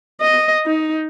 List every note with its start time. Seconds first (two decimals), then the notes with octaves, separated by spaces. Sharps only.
0.21 D#5
0.67 D#4